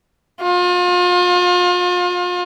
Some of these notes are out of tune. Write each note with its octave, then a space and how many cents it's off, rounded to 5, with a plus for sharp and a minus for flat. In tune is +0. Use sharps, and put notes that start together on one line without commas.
F4 +35